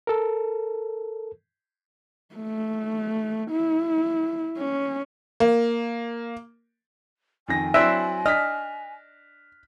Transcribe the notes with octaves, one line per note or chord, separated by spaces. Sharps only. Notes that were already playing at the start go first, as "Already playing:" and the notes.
A4 A#4
A3
E4
C#4
A#3
F2 D#3 G#5 A#6
F#3 C4 D4 E4 E5 C6 F#6
D4 D#5 F6 B6